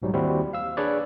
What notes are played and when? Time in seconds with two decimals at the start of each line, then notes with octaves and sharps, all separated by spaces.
0.02 B1 G#2 F#3 G3
0.14 D#2 G3 C4 E4 F#4 C5
0.53 F5 E6
0.77 D4 G#4 B4 C#5 D5